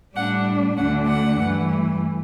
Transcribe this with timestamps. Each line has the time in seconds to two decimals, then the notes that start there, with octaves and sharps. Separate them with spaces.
0.16 A2 G3 D4 F#5
0.76 D2 D3 A3 D4 F#5
1.07 F#5
1.38 G2 E3 A3